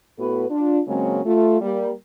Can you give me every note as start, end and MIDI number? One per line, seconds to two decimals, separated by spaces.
0.19 0.45 45
0.19 0.45 59
0.19 0.45 66
0.19 0.45 69
0.19 0.45 71
0.50 0.80 62
0.50 0.80 65
0.88 1.21 49
0.88 1.21 54
0.88 1.21 56
0.88 1.21 58
0.88 1.21 60
0.88 1.21 61
1.26 1.58 57
1.26 1.58 65
1.61 1.91 55
1.61 1.91 58